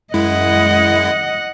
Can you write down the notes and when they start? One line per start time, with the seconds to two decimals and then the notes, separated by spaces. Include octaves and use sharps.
0.14 F#2 G#3 E4 D#5 F#5